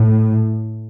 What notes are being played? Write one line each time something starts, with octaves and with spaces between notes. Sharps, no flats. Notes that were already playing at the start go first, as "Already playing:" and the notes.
Already playing: A2